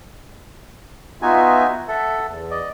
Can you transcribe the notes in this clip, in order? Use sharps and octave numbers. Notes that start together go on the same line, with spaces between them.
B3 D#4 F4 F#4 E5 G#5
A4 E5 F#5
E2
D5 D#5